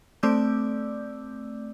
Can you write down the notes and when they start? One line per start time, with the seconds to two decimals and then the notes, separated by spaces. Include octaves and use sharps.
0.23 A3 C4 D5 D6 E6 G6